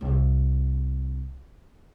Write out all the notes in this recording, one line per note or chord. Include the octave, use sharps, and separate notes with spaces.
C2 D4